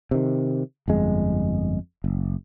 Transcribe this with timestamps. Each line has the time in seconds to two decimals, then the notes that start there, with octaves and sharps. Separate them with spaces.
0.11 C3 D#3
0.88 G1 F2 G#3
2.04 F#1